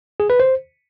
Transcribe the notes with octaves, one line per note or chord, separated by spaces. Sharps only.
G#4
B4
C5